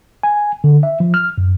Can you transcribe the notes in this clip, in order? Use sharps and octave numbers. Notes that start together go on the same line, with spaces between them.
G#5
D3
E5
F3
F6
F#2